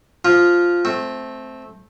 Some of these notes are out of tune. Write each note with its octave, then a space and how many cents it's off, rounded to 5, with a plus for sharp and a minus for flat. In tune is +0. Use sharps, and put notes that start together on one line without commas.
F3 +0 F4 +0
A3 -15 C4 +0